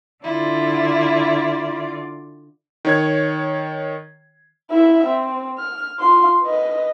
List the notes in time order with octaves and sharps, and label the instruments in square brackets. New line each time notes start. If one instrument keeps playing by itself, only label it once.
[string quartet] D3 F4 D5 [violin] E4
[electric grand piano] D#3 C#5 G#6
[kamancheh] E4 E5
C4
F6
F4 C6
B4 D#5